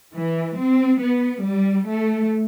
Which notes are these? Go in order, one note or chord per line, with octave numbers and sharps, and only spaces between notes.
E3
C4
B3
G3
A3